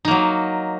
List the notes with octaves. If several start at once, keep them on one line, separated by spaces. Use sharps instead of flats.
F#3 A#3 D#4